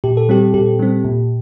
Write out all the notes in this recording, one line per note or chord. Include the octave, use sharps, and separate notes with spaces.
A#2 G4
A4
G3 C4 G4
A#2 G4
G3 C4
A#2